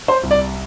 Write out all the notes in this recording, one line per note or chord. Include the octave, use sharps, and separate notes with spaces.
C5
C2
D5